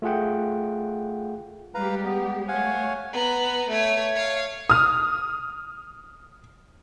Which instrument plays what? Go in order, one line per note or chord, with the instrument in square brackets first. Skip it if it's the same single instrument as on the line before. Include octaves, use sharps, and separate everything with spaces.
[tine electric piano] A3 F4 G#4 F#5 G5
[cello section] G3 G#3 G4 [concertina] B4 F5 A#5
[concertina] B3
[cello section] A3 C#5 [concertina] F5 F#5 G#5
[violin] B3 A#5
A3 C#5
C#5 F5
[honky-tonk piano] D#6 F6